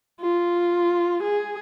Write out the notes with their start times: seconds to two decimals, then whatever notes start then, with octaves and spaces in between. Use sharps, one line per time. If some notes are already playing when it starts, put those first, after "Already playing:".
0.21 F4
1.23 G#4